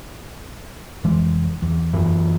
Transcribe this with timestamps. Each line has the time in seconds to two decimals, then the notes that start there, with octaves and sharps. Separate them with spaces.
1.04 F1 E3 G#3
1.62 E2
1.93 F#2 E3